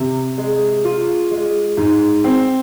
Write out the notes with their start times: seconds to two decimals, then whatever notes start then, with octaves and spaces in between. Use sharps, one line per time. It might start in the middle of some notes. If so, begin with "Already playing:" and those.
Already playing: C3
0.38 G#3
0.85 F4
1.31 G#3
1.77 G#2
2.24 C4